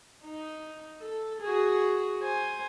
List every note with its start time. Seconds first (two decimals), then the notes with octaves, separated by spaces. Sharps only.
0.25 D#4
1.02 A4
1.42 F#4 G#4
2.23 C5 G#5